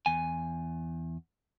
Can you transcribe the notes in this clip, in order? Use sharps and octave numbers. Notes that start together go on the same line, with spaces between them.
E2 G#5